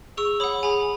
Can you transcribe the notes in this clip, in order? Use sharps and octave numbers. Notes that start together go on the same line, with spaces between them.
G#4 C#6 E6
C#5 F#5 B5 D#6
G#4 G#5 B5